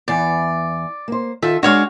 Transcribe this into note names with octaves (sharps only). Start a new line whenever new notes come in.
E2 E3 D5
A#3 C5
D#3 F4 A4 E5
G#3 D4 F#4 C#5 F5